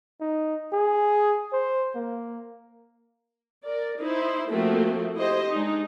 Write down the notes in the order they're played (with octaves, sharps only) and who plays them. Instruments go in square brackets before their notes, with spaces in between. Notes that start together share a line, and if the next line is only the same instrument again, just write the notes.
[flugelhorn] D#4
G#4
C5
A#3
[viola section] A#4 D5
D#4 E4 C5
F3 A3 A#3 C4 F#4
E4 G4 C5 D#5
G#3 D4 D#4